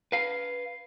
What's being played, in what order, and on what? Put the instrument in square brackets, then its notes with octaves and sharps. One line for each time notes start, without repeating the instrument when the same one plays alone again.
[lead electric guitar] B4 F5